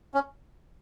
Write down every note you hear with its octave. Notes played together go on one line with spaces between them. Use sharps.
C#4